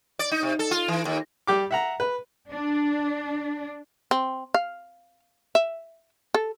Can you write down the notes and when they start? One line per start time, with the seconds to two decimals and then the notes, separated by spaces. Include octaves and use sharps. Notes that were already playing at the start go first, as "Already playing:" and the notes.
0.19 D5
0.32 D#4
0.43 C3
0.59 A4
0.71 F4
0.88 E3
1.05 D#2
1.47 G3 G4 D6
1.71 E5 F#5 A#5
2.00 B4
2.51 D4
4.11 C4
4.54 F5
5.55 E5
6.34 A4